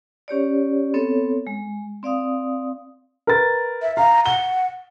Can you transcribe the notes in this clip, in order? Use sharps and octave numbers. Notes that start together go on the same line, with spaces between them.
C#4 G4 C#5 D5
B3 C4 A4 C#5
G#3
C4 D5 F5 D#6
A#4 B4 A6
E5
F5 A#5
F#5 G7